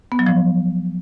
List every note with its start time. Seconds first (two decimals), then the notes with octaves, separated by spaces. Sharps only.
0.12 B3
0.19 F#3
0.26 F3